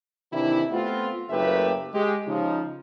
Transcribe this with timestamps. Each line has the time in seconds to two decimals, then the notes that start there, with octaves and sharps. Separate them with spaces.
0.33 C3 D#3 E3 D4 E4
0.72 A3 B3 C4 F4
1.30 F#1 A3 A#3 G4 B4 E5
1.94 G#3 G4
2.27 C#3 F3 D#4